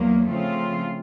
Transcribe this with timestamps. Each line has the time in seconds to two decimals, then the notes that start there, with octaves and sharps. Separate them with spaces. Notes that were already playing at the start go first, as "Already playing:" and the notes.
Already playing: E2 F#3 A#3
0.27 C#3 F3 A3 C4 F4